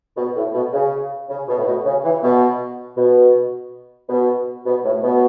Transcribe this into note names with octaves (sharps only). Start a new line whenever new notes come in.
B2
A2
B2
C#3
C#3
B2
A2
B2
C#3
E3
B2
B2
B2
B2
A2
B2